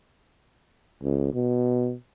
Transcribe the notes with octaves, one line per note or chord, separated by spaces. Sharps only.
C#2
B2